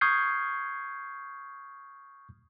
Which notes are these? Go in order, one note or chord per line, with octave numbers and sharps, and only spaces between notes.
C#6 D#6 F6 G6 G#6 C7